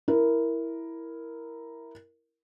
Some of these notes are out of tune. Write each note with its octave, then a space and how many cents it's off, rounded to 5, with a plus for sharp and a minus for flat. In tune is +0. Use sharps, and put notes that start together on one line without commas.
E4 +0 A#4 +0